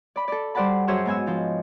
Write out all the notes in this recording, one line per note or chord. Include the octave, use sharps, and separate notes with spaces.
D5 B5
A4 D5
G3 C5 D5 F#5 A5 B5
F#2 G#4 C5 C#5 E6
G#2 B3 G#5 E6
F3 D#4